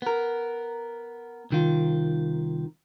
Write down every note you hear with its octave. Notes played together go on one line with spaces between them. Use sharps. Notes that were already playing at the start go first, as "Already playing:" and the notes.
B3 A#4
C2 D#3 F4